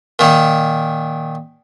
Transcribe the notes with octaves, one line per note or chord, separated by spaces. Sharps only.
A#2 D#3